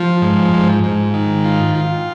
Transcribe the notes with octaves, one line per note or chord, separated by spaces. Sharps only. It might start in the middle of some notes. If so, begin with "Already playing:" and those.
Already playing: F3
G#2
G#2
G#2
D#3
F4
F4